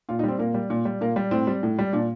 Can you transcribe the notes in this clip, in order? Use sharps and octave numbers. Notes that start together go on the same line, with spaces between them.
A#2 F4
D#4
G3 C4
A#2 A#3
G3
A#2
G3
A#2 A#3
G3
A2 C4
G3
A2
G3
A#2 D4